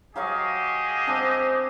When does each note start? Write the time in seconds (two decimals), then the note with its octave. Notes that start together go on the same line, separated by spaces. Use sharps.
0.16 F#3 G4 G#4 D#5 F5 C#6
1.07 C4 D4